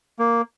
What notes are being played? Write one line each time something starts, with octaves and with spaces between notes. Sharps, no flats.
A#3